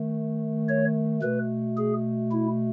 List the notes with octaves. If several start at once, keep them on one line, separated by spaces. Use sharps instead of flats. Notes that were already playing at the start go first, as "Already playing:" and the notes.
Already playing: D#3 A3
C#5
B2 A3 B4
G#4
E4